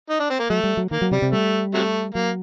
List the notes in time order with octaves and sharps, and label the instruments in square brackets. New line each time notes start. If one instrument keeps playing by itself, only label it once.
[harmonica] D#4
D4
C4
A#3
[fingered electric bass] F#3 [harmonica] A3
[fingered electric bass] G3
F#3
[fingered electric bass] D#3 [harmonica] A#3
[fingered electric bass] F#3
[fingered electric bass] C3 [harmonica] G3
[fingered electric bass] C3
[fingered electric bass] G3 [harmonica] A3
[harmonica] C3 F#3 A3
[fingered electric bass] F#3 [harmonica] A#3